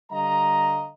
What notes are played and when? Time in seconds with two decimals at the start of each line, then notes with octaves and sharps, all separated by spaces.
0.11 D3 G3 D#5 F5 A#5